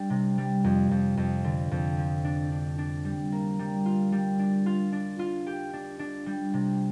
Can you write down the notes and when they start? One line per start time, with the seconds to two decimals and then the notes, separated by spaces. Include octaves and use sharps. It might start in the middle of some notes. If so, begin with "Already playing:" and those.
Already playing: G3 D4
0.10 C3
0.38 G3
0.64 F2
0.91 F2
1.17 F2
1.44 D3
1.71 F2
1.98 F3
2.25 D4
2.52 D4
2.78 D4
3.05 G3
3.32 A#3
3.59 G3
3.86 F4
4.12 G3
4.39 D4
4.66 F4
4.92 D4
5.19 F4
5.47 G4
5.73 D4
5.99 D4
6.26 G3
6.54 C3